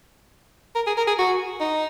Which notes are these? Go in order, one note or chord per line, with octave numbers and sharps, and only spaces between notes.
A#4
G#4
A#4
G#4
F#4
D#4